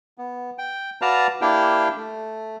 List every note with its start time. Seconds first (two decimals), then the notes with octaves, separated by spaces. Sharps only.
0.18 B3
0.58 G5
1.02 F#4 B4 D5 F5 A5 A#5
1.41 A#3 D4 E4 G4 F5 G5
1.96 A3